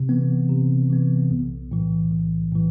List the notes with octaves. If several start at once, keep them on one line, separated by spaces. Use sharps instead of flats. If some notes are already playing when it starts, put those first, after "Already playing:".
Already playing: C3
E3 B3
C3
E3 B3
B1
A2 E3
B1
A2 E3